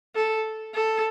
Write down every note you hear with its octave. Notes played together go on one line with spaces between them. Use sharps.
A4
A4